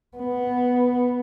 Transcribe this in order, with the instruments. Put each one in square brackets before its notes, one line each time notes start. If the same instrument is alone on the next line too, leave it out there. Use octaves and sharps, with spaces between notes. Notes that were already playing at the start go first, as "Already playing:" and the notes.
[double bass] B3